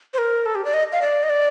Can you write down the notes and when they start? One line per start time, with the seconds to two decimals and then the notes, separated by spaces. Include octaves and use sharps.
0.14 C5
0.18 A#4
0.46 A4
0.55 G4
0.65 D5
0.74 D#5
0.92 F5
1.02 D5
1.23 D#5
1.30 D5